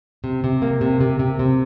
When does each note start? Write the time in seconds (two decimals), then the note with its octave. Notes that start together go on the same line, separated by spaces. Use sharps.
0.24 C3
0.44 C3
0.62 A#3
0.81 C3
1.01 C3
1.19 C3
1.39 C3